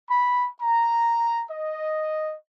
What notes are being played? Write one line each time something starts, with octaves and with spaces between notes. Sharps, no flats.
B5
A#5
D#5